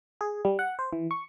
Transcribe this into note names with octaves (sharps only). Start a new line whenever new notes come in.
G#4
G3
F#5
C5
E3
C#6